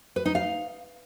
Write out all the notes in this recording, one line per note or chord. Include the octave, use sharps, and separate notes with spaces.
B4
D#4
F5